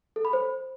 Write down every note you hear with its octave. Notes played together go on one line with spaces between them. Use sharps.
A4
B5
C5